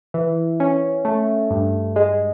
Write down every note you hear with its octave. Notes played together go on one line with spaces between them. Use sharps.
E3
C#4
A3
G2
G#3